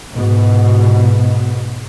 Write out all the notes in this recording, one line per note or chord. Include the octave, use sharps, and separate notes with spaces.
G#2 B2